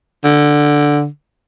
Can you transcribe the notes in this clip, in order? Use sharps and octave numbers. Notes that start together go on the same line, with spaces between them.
D3